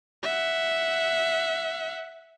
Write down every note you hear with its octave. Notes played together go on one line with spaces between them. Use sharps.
E5 F#5